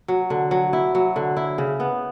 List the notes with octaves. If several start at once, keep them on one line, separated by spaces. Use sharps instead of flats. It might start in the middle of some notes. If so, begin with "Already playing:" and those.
F#3
D3
F#3
E4
F#3
D3
E4
C#3
B3